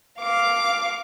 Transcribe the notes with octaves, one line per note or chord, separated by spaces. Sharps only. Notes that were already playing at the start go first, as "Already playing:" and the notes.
F5 D6